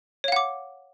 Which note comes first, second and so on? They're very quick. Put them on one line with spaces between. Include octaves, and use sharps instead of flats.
C#5 F5 F#5 D6